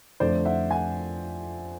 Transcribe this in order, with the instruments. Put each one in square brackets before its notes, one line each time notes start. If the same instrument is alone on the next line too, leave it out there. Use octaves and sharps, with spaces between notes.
[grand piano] F2 D3 F3 A3 C5 D5
E5 F#5
F#5 G#5